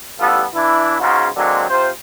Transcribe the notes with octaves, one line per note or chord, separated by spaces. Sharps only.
A1 G3 B3 F4 A4
E3 D4 E4
G#2 C#3 F4 F#4
D3 F#3 G#3 A#3 C4
C3 F4 C5